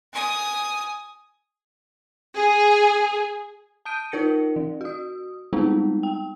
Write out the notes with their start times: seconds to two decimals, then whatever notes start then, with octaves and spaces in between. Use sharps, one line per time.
0.13 G#5 D#6
2.35 G#4
3.85 A5 D#6 G6 D7 D#7
4.12 D#4 F4 A#4 A#6 C#7
4.56 E3
4.81 F#4 D#6
5.53 G3 G#3 B3 C4 D#4
6.03 G5